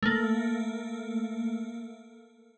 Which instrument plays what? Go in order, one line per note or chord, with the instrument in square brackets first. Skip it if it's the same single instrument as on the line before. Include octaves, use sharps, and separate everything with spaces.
[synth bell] A3 A#3